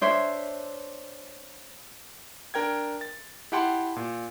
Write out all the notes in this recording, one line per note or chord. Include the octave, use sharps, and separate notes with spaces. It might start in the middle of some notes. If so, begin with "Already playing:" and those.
D4 C5 C#5 E5
D4 A#4 G5 G#6
A6
E4 G4 F#5 G5 A5 C6
A#2